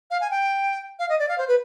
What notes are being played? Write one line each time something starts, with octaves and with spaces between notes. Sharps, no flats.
F5
G#5
G5
F5
D#5
D5
F5
C5
B4